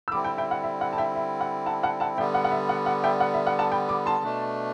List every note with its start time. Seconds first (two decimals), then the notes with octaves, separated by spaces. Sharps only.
0.08 E6
0.12 D3 G3 C4 E4 B5 D6
0.24 G5 B5
0.38 E5 G5
0.51 F#5
0.64 E5
0.81 F#5
0.93 A5
0.98 E5 G5
1.15 E5
1.41 F#5
1.66 F#5 A5
1.83 F#5 A5
2.00 F#5 A5
2.18 D3 G3 B3 E5 G5
2.34 F#5
2.44 F#5
2.51 E5
2.69 F#5
2.86 F#5
3.04 E5 G5
3.20 F#5
3.34 E5
3.47 F#5
3.59 F#5 A5
3.72 G5 B5
3.89 B5 D6
4.06 A5 C6
4.24 B2 A3 D4